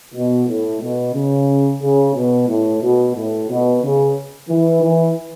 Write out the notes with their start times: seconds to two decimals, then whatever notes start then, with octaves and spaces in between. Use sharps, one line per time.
0.15 B2
0.48 A2
0.82 B2
1.15 C#3
1.82 C#3
2.16 B2
2.48 A2
2.83 B2
3.17 A2
3.50 B2
3.83 C#3
4.50 E3
4.83 E3